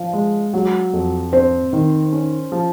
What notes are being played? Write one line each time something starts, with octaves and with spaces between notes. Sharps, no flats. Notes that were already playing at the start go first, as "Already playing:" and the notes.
Already playing: F3 F5
G#3
F#3
F2
C4 C5
D#3
C#4
F3